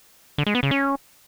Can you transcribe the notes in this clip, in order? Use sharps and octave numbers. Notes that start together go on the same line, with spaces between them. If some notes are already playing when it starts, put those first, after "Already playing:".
D3
G#3
B3
C#3
C#4